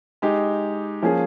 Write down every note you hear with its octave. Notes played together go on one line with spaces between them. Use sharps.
G#3 D#4 G4
F3 A#3 C#4 G#4